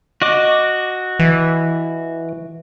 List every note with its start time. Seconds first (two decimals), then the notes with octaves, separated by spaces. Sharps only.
0.22 F#4 D#5 D6
1.19 E3